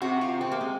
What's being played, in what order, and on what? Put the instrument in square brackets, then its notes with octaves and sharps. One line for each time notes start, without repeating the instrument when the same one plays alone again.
[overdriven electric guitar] C3 [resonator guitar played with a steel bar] F#4
[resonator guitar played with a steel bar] F4
C4
A#3
G#3